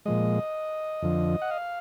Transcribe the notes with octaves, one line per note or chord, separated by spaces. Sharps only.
A#2 F3 G#3 D#5
F2 D3 F3
F#5
F5